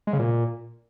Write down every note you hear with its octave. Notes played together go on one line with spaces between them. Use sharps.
G#3
C#3
A#2